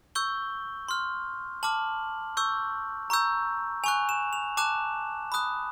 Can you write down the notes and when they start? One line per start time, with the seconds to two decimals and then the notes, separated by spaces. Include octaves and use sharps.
0.15 C#6 E6 G6 G7
0.89 C6 F6
1.63 A5 D6 F6 F#7
2.37 C#6 E6 G6
3.10 A#5 C#6 E6 G6
3.84 G#5 C#6 F#6 F7
4.09 E7
4.33 F7
4.57 A5 D6 F#6 E7
5.32 B5 D#6 F#6